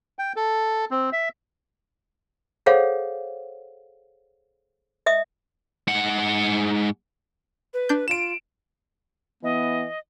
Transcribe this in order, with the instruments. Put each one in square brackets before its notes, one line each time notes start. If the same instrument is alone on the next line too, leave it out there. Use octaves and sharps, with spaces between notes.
[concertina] G5
A4
C4
E5
[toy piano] G#4 A4 C5 C#5 F5 F#5
D#5 E5 D#6
[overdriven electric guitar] G#2 F#5
[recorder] B4
[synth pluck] D4 G6
[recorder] F4 [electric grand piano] D7 E7
[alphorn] E3 [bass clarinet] B3 [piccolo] D#5